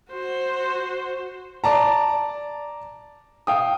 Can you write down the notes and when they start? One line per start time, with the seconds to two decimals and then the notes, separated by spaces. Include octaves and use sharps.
0.12 F#4 C5
1.64 D5 A5 A#5
3.47 F5 G5 D#6